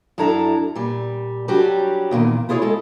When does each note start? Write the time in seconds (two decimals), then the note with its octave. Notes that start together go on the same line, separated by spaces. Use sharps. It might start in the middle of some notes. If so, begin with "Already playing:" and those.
0.18 F#2 D4 E4 A4 A#5
0.75 A#2 G3
1.48 F#3 G3 C#4 D4 F#4 G4
2.11 E2 A#2 D3 D#3
2.49 E4 F4 G#4 B4 C#5
2.62 G#3 A4